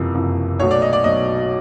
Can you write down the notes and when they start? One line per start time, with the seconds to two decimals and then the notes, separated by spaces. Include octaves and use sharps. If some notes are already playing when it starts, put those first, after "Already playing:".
Already playing: F#1 F2 C3 E3
0.14 F#1 F2 C3 E3
0.59 B1 B2 F#3 A3 C#5
0.71 D5
0.82 D#5
0.93 D5
1.04 B1 B2 F#3 A3 D#5